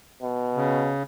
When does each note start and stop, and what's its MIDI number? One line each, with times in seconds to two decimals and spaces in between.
0.22 0.94 47
0.55 1.03 49